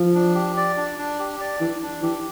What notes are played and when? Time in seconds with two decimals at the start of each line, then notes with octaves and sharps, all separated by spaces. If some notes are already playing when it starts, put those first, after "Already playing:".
Already playing: F3
0.15 D4
0.35 G4
0.57 D5
0.77 D4
0.98 D4
1.19 G4
1.41 D5
1.60 E3 D4
1.82 D4
2.02 E3 G4